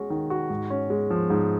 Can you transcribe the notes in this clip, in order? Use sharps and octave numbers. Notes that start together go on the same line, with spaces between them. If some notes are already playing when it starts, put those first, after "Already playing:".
Already playing: G#3 C#4 F#4
D#3
F#4
G#2
C#4
G#3
F3
G#2